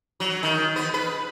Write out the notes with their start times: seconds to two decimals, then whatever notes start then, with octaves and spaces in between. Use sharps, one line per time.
0.20 F#3
0.43 D#3
0.76 B3
0.94 B4